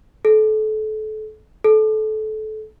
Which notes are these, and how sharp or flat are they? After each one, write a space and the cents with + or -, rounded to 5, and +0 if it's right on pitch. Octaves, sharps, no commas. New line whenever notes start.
A4 -30
A4 -25